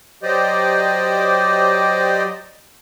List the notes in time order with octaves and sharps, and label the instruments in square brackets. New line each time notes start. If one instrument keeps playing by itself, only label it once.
[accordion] F#3 G4 C5 D5 D#5